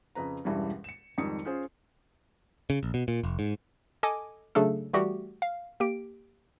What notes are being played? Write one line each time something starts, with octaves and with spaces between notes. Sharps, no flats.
F2 C#3 B4 A#5
E1 G2 E3 G3 C#4
C#7 E7
F2 G#2 D#3 G3 D#6 C#7
C#4 F4 G#4 C5
C#3
A#1
B2
A#2
F1
G#2
A4 D#5 G#5 D6
C#3 F#3 A3 D4 G#4 A4
E3 G3 A3 F#4 G4
F5
A#3 G4 D7